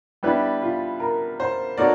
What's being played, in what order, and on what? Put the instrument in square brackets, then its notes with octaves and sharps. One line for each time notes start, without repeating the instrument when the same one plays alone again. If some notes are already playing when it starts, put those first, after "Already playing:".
[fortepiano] G3 B3 D4 G4 B4 [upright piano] E4
[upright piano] F4
A#4
C5
[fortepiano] A#3 D#4 F#4 A4 C#5 [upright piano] D5